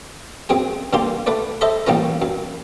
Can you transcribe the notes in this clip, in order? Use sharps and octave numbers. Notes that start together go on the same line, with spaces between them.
F#2 C4 G#4 G#5
G2 D3 A#3 G4 C6
A3 B4 D5
A4 C5 D#5 E5 A#5 B5
A1 G3 A#3 B3 C#4 A#5
F#2